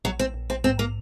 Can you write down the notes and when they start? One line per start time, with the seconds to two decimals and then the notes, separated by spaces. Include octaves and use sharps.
0.04 A#1 F#3
0.19 C4
0.34 A#1
0.50 C4
0.64 G#2 C4
0.79 A#3